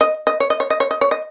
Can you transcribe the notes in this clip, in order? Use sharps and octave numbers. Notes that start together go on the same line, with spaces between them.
D#5
D#5
C#5
D#5
C#5
D#5
C#5
D#5
C#5
D#5